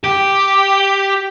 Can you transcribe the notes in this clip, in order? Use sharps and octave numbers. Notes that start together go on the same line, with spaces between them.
G4